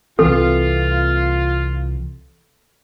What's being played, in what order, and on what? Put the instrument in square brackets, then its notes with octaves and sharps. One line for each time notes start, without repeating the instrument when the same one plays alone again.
[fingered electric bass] C2 E3 C4 [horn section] F4 [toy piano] A4